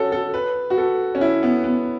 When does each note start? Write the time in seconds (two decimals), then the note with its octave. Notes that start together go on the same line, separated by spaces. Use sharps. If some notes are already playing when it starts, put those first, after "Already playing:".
Already playing: C#4 F#4 A4
0.12 A4
0.34 B4
0.70 F#4
0.78 A4
1.15 C#4
1.21 E4
1.43 B3
1.64 B3